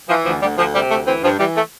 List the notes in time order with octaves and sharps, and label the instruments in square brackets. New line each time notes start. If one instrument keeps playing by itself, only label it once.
[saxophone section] E3 F3
D2 F3
D2 G3
D2 F3
C3 G3
D2 A3
E3 C4
G2 F3
E3 G3
A3